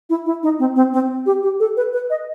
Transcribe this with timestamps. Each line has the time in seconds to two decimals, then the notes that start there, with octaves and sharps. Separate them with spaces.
0.10 E4
0.26 E4
0.43 D#4
0.59 C4
0.76 C4
0.93 C4
1.26 G4
1.43 G4
1.60 A4
1.77 B4
1.93 B4
2.10 D#5